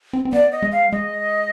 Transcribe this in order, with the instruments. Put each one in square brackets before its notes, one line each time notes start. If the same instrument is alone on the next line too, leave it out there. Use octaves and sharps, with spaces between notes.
[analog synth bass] C4
C4
[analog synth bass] B3 [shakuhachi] D5
[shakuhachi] D#5
[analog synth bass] G#3
[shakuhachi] F5
[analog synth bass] G#3 [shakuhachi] D#5